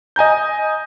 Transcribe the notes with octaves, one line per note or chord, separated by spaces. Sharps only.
D#5 G#5 A#5 G6